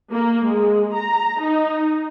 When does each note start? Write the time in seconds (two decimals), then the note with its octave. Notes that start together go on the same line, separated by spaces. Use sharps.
0.11 A#3
0.47 G#3
0.95 A#5
1.41 D#4